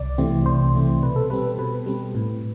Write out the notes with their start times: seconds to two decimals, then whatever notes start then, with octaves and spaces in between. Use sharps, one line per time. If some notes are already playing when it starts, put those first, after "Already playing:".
Already playing: C2 D5
0.18 C3 E3 A3 C4
0.46 C2 C5
0.75 C3 E3 A3 C4
1.02 B2 B4
1.16 A4
1.30 G3 C4 B4
1.58 B2 B4
1.86 G3 C4
2.15 A2